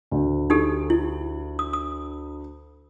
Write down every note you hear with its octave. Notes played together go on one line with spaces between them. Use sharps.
D2
D#4 G4 A4
E4
D#6
D#6